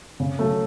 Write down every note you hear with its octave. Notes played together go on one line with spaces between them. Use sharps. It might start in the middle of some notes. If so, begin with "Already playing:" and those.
C#3
F#3 A3